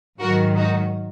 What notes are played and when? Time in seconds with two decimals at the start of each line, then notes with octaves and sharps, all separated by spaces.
0.19 G#2 D#3 F#3 F#4 A#4
0.56 D#4 F#4